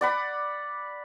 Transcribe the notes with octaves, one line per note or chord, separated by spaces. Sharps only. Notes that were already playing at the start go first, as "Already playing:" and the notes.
D5 F#5 B5